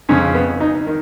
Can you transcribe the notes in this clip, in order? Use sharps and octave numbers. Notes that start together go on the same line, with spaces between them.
F2 C#3 C#4
B3
D#4
D#3